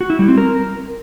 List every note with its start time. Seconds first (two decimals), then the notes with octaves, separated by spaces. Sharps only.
0.01 F#4
0.10 E4
0.19 G3
0.28 C4
0.38 A#4